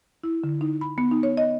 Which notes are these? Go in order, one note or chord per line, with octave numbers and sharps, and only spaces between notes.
E4
D3
D#4
B5
B3
D#4
C#5
D#5